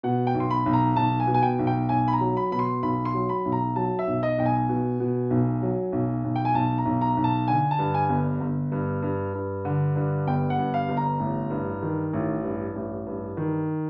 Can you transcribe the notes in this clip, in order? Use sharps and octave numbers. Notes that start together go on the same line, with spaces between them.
B2 F#5
G5
B1
C6
B5
B1
A#5
B1 A5
G#5
B2
G#5
G5
B1
G5
B1 G#5
B5
A#5
F#3
B5
B2 B5
C6
B1 B5
C6
F#3
B5
B1
A#5
F#3 A5
E5
B1
D#5
B1 G5
G#5
B2
B2
B1
F#3
B1
B1
G5
G#5
B1 A5
A#5
B1
A#5
B1
A5
D3 G#5
A5
G2
G#5
G1
G1
G2
G2
G2
D3
G2
G1 G5
F#5
G2
F5
G1
A#5
A1
G2
D#3
A1
G2
A1
G2
D#3